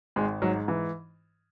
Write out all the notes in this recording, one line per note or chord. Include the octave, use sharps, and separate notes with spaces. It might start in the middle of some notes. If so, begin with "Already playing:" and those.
G#1 G#3
G#2 F#3
E3